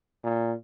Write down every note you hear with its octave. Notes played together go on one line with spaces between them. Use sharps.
A#2